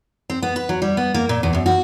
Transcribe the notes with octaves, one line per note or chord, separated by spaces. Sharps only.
C4
B3
B4
F#3
G3
B3
A#3
A#2
E2
F#2
F#4